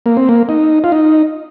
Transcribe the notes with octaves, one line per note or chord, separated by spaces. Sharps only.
A#3
C4
A#3
D#4
F4
D#4